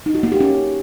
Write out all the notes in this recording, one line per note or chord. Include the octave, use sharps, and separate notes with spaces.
D#4
F#4
A#3
G4
C#4